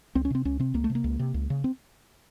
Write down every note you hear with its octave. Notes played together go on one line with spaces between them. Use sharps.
C#2 C4
C#4
C3 C4
C#2 C#4
C3 C4
C#2 A#3
A3
C3
A#3
C#2
C3
C#2
C#3
C4